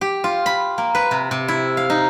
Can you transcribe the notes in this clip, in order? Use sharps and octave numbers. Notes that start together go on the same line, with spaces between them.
G4
F4
B5
A#3
B4
C3
C3
E4
F5
D#4